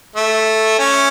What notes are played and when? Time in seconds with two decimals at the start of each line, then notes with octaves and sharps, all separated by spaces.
0.16 A3
0.79 C#4